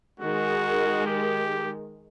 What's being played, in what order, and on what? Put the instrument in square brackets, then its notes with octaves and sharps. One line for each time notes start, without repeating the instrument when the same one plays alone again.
[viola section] D#3 G#3 [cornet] F#4
[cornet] G4